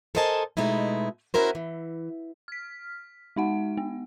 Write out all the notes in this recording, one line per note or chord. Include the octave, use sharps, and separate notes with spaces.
A4 A#4 C5 D#5 G#5 A5
B2 G#3 A3 D#4 E4
B3 C#4 E4 F#4 A#4 C5
E3
F6 B6
G#3 D#4 F#5
B3